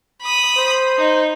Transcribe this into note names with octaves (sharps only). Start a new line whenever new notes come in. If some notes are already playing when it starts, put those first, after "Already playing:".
B5 D#6
C5
D#4